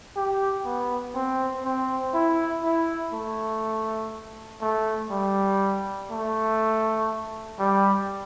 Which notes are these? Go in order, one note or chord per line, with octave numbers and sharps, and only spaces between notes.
G4
B3
C4
C4
E4
E4
A3
A3
G3
A3
G3